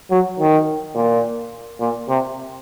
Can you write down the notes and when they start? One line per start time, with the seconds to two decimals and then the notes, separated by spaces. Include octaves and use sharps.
0.11 F#3
0.40 D#3
0.95 A#2
1.80 A#2
2.09 C3